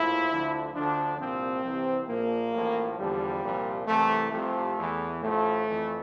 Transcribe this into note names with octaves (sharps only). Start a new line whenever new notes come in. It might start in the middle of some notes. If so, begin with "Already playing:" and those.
Already playing: A#1 A2 F3 E4
D2 D3 F3
D2 D3 F3 D4
C2 A#2 F3 C4
C2 C3 E3
A#1 A#2 F3 A#3
A1 A2 F3
E2 D3 F3 G3
C2 A#2 F3
C2 C3 E3 A3
C2 C3 F3 A3
E2 E3
A1 A2 F3 A3
F2 E3